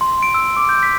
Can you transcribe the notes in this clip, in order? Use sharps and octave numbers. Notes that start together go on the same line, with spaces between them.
C6
D7
E6
D6
G6
B6